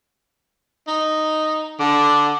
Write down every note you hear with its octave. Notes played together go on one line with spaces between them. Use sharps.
D#4
D3 D6